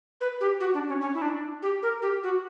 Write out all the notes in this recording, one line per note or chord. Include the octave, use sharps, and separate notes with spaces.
B4
G4
F#4
D4
C#4
C#4
E4
D4
G4
A#4
G4
F#4